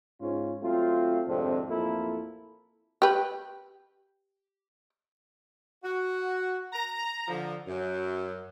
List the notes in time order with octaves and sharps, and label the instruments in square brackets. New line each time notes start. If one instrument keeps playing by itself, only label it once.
[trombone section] G#2 C#4 F4
F#3 A3 C4 F4
G#1 F2 A2 C3 C4 D4
A1 F2 A#3 E4 F4 A4
[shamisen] G4 B4
[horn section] F#4
A#5
D3 F3
F#2